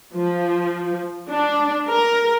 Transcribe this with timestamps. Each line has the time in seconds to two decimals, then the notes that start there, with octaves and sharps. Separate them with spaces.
0.15 F3
1.29 D4
1.88 A#4